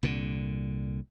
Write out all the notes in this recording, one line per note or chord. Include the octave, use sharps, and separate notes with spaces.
C2 A#2 D3